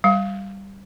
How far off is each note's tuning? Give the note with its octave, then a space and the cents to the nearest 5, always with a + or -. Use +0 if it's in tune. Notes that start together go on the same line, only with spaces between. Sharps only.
G3 +0 F5 +0